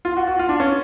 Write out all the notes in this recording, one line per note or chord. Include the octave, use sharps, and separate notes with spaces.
F4
F#4
F#4
F4
D4
C#4